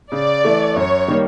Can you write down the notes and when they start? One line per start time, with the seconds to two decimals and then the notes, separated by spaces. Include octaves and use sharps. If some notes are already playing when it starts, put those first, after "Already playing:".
0.12 C#3 D5
0.45 E3 A3
0.76 F#2 C#5
1.08 D#3 G3 A#3